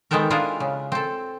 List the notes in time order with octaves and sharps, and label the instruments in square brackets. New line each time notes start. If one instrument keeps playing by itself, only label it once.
[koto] D#3 G#3 B3 C4 A4 A#4
G#3 D4 E4 F4 G#4 A#4
C#3
C4 A4